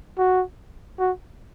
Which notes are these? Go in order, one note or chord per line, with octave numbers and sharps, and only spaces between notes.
F#4
F#4